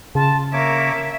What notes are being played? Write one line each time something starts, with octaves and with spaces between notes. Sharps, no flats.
C#3 F4 A5
A#3 A#4 C#5 E5 D6